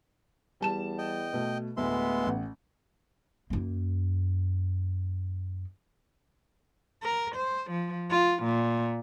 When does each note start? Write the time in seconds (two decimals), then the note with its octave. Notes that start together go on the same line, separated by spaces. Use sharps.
0.61 E2 G3 A5 E7
0.98 D#5 G5
1.33 B2 A3
1.77 D2 A2 G#3 B3 E5 C6
2.24 A1 F#5
3.50 F#2 A#3
7.03 A#4
7.36 C5
7.71 F3
8.10 F4
8.43 A#2